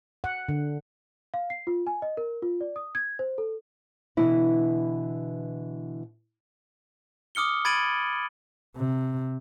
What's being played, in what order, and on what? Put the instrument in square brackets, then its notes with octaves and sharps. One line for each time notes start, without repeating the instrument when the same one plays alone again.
[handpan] F#5
D3
[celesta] F5
C7
F4
G#5
D#5
A#4
F4
D5
D#6
G#6
C5
A4
[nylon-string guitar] B2 D3 E3 E4
[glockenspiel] D6 D#6 F6 C#7 G7
B5 G#6 A6 D7 D#7 F#7
[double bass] C3